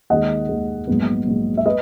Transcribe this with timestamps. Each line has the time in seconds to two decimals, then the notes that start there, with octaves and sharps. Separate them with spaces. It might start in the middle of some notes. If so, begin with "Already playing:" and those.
0.10 D#2 D#3 G#3 D#5 F#5
0.49 D#2 D#3 G#3
0.87 A#1 G#2 F#3 B3
1.26 A#1 G#2 F#3 B3
1.57 E5
1.66 B4 D#5